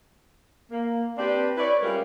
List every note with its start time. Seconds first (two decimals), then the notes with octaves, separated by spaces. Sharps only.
0.71 A#3
1.18 C4 D4 G4 B4 D5
1.58 E4 B4 C#5 D5
1.83 G3 G#3 C#4 F4 A#4